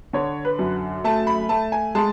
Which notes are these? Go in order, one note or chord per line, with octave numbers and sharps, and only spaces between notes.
D3 C#5
B4
F#2
A3 A5
B5
A3 A5
G#5
G#3 A5